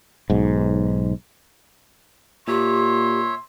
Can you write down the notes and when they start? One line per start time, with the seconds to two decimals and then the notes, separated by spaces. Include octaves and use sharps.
0.30 B1 G#2
2.48 A#2 G4 C#5 E5 C6